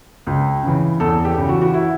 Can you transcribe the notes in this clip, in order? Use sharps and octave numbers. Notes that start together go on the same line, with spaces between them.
C#2
C#3 E3
E2 A4
G4
C#3 E3
F#4
F#4
E4